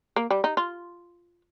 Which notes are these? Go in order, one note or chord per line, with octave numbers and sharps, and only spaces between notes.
A#3
G3
D#4
F4